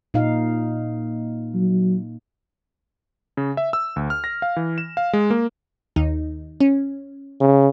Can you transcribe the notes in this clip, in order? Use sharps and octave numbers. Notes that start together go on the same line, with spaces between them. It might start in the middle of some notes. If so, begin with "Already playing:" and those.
A#2 D#4 F5
F#3
C#3
E5
E6
D2
F6
A#6
F5
E3
E7
F5
G#3
A#3
D#2 D#4
C#4
C#3